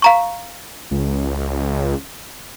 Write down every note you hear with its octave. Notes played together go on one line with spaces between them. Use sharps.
F5 A#5 C#6
C#2